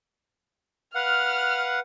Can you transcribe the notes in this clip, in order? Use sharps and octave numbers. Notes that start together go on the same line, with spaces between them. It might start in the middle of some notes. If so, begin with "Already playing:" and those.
B4 F5 F#5 F6